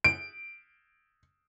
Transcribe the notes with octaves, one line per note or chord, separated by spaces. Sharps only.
D7